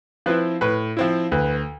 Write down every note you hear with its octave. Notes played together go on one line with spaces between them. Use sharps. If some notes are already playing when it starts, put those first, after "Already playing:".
F3 C4 E4 B4
A2 B4
F3 C4 E4
D2 B4